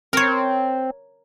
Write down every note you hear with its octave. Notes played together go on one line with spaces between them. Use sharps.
C4 A#4 C#5